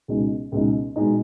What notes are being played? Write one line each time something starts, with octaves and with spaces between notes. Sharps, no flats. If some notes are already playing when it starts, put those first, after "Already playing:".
C#2 B2 G#3 D#4
C#2 B2 G#3 D#4
B2 G#3 D#4